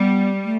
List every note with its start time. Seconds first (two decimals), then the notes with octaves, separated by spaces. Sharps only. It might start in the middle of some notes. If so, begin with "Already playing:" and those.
Already playing: G3 B3
0.44 A3